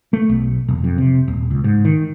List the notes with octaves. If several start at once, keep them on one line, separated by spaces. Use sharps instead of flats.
A3
B1
E1
F2
C3
D#1
C#2
G#2
D#3